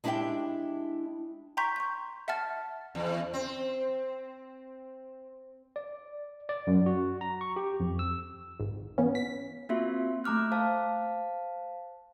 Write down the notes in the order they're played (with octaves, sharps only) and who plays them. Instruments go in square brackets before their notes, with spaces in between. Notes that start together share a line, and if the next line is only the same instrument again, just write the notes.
[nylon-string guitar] G#3 D4 E4 G4 E5 G5
[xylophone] G5 A#5 C6 C#6 G6 B6
C#6 G6
E5 F#5 A5 F6 A6
[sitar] E2
C4
[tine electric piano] D5
D5
F#2
F#4
A#5
C#6
G4
F2
E6
[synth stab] G#1
E3 B3 C#4
B6
[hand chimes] A#3 C4 F4 F#4 E5 C6
A3 A#5 D6 F6 F#6
C5 F5 A5